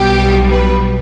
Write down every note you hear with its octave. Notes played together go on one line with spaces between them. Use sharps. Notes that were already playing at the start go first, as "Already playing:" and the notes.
Already playing: B1 B2 G3 G4
B4